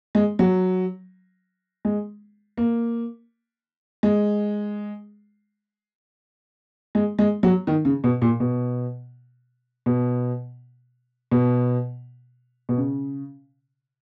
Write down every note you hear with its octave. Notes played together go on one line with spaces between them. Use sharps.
G#3
F#3
G#3
A#3
G#3
G#3
G#3
F#3
D#3
C#3
B2
A#2
B2
B2
B2
B2
C#3